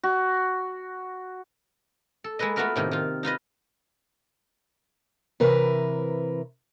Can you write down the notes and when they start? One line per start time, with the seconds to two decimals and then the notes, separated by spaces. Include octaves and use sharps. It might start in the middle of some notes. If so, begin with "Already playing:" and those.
0.03 F#4
2.24 A4
2.39 G#3 A#3 A4 B4 D#5
2.56 A3 B3 F4 F#4 A#4 B4
2.76 A2 C3 D#3 A#3
2.91 D#3 F4
3.23 D#4 F4 B4 D#5
5.40 C3 E3 A#4 B4